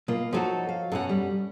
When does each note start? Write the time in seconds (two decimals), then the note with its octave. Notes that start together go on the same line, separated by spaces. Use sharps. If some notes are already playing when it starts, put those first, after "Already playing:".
0.08 B2 A#3 F4
0.33 F3 F#3 D#4 F#4 A4
0.69 F5
0.92 F#2 B2 C#4 A4 F#5
1.09 G3